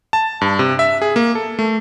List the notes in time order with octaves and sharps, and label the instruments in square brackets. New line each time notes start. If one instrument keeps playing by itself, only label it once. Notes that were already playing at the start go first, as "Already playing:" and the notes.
[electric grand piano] A5
G2
C3
E5
G#4
A#3
A4
A3